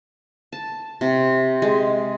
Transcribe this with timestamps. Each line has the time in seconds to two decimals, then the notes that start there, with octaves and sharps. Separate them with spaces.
0.53 A5
1.01 C3
1.62 G#3